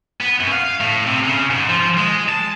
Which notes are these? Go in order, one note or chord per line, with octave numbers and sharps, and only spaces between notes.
B3
F#2
F5
A2
C3
C#3
G#2
F3
G#3
A5